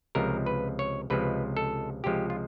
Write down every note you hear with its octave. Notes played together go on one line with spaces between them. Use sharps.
C#2 C3 F3 G#3 A#4
B4
C#5
C#2 C3 F3 G#3 B4
A4
C#2 C3 F3 G#3 G4
F4